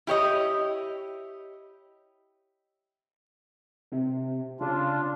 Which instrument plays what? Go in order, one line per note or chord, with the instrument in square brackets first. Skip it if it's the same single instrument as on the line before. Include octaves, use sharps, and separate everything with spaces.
[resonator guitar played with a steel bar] E4 G4 C#5 D#5
[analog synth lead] C3
[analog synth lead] C#3 [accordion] D4 F4